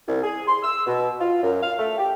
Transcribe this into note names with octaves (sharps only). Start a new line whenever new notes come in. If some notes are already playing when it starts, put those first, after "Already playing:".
C2
G#4
C6
E6
B2
F4
F#2
F5
A3
G4